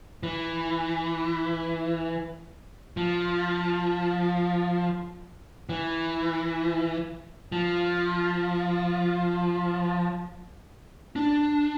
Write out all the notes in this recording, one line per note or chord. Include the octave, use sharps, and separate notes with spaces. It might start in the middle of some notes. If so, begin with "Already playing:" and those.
E3
F3
E3
F3
D4